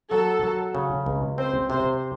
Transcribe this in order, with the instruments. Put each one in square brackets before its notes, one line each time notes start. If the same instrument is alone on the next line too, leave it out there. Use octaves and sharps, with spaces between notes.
[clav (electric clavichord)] F#3 [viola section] A4
[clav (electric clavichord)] F#3
C#3
C#2
[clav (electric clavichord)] C4 [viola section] C5
[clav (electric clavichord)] C3 [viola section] C5